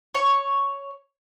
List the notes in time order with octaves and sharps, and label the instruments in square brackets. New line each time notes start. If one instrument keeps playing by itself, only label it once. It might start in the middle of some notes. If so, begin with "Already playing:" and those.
[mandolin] C#5 C#6